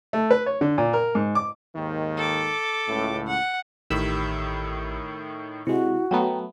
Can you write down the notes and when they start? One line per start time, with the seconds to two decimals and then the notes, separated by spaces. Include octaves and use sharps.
0.13 A3
0.31 B4
0.46 C#5
0.61 D3
0.78 A#2
0.93 A#4
1.15 G#2
1.35 D6
1.75 D#2 G#2 D#3
2.17 A4 D6
2.87 C#2 A2
3.27 F#5
3.90 A1 A2 D#3 G4 B5 E6
5.67 C3 G#3 E4 F#4
6.11 F#3 A3 B3 G5 A#5